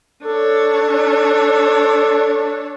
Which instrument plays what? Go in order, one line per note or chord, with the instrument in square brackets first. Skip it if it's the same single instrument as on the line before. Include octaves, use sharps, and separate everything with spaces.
[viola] D4 C#5 [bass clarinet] A4